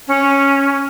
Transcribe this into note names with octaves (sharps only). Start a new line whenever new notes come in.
C#4